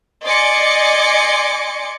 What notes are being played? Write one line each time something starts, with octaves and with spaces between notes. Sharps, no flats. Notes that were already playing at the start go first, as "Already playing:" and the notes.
D5 D#5 G#5 C6 D6 C#7